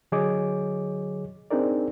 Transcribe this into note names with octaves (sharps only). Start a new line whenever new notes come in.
D3 F#3 G#4 C#5 D#5 D6
C4 D4 D#4 G#4 A#4 D5